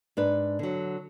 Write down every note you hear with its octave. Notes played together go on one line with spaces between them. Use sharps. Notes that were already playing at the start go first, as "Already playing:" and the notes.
G#2 D4 B4
D3 F#3